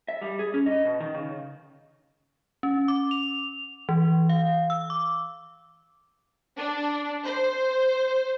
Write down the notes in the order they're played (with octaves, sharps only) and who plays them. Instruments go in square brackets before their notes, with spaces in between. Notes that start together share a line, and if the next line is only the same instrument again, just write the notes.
[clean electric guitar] E5
G3
G#4
C#4
D#5
B2
D#3
C#3
[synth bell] C#4
D6
F7
E3
F5
E6
D6
[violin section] D4
C5